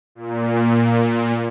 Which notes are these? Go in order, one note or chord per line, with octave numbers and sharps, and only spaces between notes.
A#2